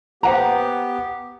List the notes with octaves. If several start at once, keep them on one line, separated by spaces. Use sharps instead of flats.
B3 G4 C5 F#5 A#5